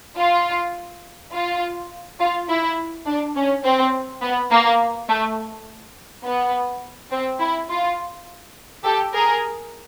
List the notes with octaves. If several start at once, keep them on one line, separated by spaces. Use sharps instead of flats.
F4
F4
F4
E4
D4
C#4
C4
B3
A#3
A3
B3
C4
E4
F4
G4 A4
G#4 A#4